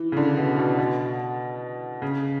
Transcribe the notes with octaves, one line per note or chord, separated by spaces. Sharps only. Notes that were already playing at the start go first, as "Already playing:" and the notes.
Already playing: E3
C#3
D3
B2
B2
B2
C#3